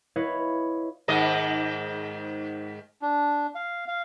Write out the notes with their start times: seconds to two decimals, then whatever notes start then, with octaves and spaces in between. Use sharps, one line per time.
0.16 E4 B4 C#5 D#5 F5
1.08 G#2 D#3 D#5
3.02 D4
3.55 F5
3.88 F5